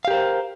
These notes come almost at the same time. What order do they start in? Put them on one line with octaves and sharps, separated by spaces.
F5 G4 A#4 C5